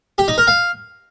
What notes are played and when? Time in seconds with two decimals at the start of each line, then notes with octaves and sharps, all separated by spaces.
0.18 G4
0.28 D#4
0.38 A#4
0.47 F5